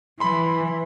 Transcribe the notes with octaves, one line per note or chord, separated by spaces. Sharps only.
E3 B5 C6